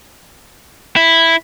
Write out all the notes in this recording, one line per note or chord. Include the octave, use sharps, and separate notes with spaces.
E4